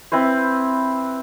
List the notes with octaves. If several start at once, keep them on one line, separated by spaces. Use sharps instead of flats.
C4 E4 B4 C5